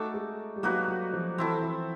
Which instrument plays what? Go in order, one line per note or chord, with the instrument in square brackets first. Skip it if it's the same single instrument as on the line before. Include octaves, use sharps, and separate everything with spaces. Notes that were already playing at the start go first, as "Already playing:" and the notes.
Already playing: [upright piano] A3 [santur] D#4 F#4 A4 D5
[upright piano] G#3
G3
[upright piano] F#3 [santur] A#3 D#4 F#4 B4
[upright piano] F#3
F3
[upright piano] E3 [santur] C4 E4 A4
[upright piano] F3